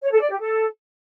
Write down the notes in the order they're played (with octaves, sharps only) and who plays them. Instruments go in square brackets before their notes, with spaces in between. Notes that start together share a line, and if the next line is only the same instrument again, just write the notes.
[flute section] C#5
A4
D5
G4
A4